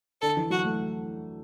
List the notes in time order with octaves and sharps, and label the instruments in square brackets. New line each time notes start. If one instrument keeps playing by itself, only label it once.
[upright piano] D3 [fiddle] A4
[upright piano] E3
[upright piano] F#3 [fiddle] F#4
[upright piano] A3